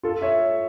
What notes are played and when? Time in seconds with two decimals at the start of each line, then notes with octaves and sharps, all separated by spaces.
0.03 F4 A4
0.22 C#5 E5